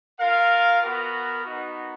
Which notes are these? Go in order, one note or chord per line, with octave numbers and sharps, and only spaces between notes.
F4 A#4 F5
B3 F#4 A#4
B3 D#4 F#4